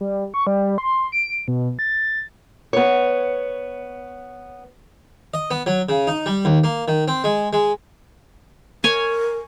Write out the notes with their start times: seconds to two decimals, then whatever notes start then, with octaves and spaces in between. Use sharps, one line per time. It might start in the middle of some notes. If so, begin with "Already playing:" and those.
0.01 G3
0.34 C#6
0.47 G3
0.78 C6
1.12 D7
1.48 B2
1.79 A6
2.73 B3 C#5
5.34 D#5
5.51 B3
5.66 F#3
5.89 C#3
6.07 D#4
6.26 G3
6.45 D#2
6.64 A#3
6.88 D#3
7.08 C4
7.24 G#3
7.53 G#3
8.84 A#4 C#5 G#5